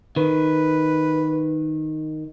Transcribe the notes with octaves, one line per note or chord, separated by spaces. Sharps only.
D#3 B4